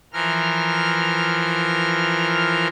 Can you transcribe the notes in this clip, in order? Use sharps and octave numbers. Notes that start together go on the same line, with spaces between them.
E3 F3 A#4 F6